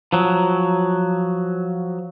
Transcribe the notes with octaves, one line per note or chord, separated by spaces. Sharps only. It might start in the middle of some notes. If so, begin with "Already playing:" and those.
F3 F#3